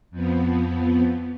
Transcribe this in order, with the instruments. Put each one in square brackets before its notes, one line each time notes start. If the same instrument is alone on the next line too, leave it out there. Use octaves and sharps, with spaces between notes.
[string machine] F2 F3 B3